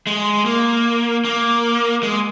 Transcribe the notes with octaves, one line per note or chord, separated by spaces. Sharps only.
G#3
A#3
A#3
G#3